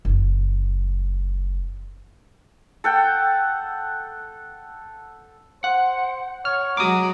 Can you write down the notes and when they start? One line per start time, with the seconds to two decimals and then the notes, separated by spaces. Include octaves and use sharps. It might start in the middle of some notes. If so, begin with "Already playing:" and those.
0.05 F#1 E3
2.84 A4 F#5 G5
5.64 C5 F#5
6.45 C#5 F6
6.77 F#3 G#3 F#4 A#5 D6 D#6